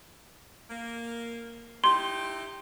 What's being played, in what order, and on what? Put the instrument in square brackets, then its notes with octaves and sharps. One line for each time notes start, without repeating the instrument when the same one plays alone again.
[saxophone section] A#3
[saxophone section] D#4 E4 G4 [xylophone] C6